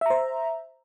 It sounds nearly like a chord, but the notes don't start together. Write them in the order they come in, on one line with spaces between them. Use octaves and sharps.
E5 A#5 C5